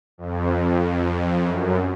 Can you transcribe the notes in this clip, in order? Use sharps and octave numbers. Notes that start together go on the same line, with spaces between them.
F2
F#2